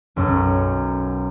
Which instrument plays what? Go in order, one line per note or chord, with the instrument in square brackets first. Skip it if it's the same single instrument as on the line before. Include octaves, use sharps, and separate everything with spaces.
[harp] B1 F#2 A4